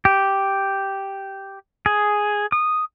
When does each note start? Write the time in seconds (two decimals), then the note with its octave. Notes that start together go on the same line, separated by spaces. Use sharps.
0.05 G4
1.86 G#4
2.52 D#6